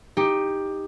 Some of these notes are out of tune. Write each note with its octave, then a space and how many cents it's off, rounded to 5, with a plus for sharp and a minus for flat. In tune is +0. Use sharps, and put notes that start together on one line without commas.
D#4 +0 G4 +10